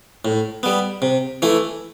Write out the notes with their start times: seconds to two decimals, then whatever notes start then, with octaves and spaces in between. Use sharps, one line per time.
0.25 A2
0.63 G3 B3
1.02 C3
1.42 E3 A3 E4